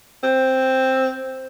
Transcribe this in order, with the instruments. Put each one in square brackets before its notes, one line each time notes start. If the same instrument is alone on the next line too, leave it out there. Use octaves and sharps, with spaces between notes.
[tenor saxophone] C4